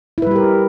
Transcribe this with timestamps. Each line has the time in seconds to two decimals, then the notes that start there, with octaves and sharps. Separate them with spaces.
0.18 E4
0.22 B4
0.27 G3
0.31 G4
0.36 A#4